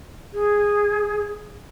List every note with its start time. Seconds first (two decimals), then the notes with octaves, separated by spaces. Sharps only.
0.34 G#4